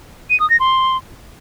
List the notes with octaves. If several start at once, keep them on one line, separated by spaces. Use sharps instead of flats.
D#7
D#6
A#6
C6